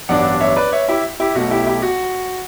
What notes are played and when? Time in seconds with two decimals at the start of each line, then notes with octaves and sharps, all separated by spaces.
0.09 A1 G2 F#3 B3 D4 D5 F#5
0.41 C#5 E5
0.56 B4 D5
0.72 C#5 E5
0.88 E4 G4
1.20 E4 G4
1.35 B1 B2 A3 F#4
1.51 E4 G4
1.67 E4 G4
1.82 F#4